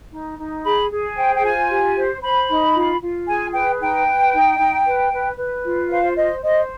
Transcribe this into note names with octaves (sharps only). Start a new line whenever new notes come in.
D#4
D#4
G#4 B5
G#4
C5 G5
G5
F4 G#5
G4
C5
C5 B5
D#4
F4
F4
G#4 G#5
B4 G5
D#4 G5
B4
D#4
D#4
B4
B4
B4
F4
C5 F5
C5 D#5
C5 D#5